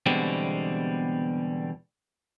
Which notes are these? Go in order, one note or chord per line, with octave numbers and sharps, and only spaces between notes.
E2 B2 D3 G3 G#3 C4